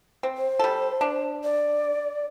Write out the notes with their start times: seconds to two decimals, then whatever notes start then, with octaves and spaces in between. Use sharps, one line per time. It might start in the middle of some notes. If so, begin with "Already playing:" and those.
0.23 C4
0.37 C5
0.59 G3 A4
1.01 D4
1.44 D5